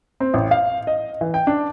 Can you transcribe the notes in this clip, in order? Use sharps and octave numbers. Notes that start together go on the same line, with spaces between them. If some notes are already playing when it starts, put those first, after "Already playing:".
C4
A1
F5
D#5
E3
G5
D4